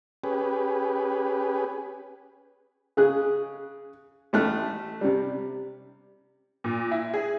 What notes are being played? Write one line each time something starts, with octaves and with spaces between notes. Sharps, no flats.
C#4 G4 G#4 B4
C#3 G#4 F#6
A1 A3 F6 F#6
C3 G3
A#2
E4
G#4